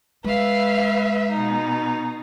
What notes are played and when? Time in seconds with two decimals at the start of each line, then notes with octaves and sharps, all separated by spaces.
0.24 G#3 B4 E5 F5
1.32 B2 D#4